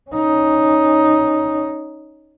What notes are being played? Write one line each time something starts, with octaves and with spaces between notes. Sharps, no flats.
C#4 D#4